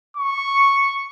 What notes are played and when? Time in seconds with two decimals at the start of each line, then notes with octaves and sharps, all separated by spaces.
0.17 C#6